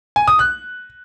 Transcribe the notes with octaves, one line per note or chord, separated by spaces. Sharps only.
G#5
D#6
F#6